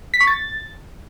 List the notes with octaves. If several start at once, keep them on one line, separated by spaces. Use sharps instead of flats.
B6
C#6
A6